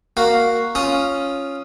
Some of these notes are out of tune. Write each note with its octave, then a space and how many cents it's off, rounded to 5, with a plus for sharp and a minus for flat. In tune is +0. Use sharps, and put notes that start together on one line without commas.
A#3 +0 F#4 +0 F5 +0
C#4 +0 F4 +0 D#6 +0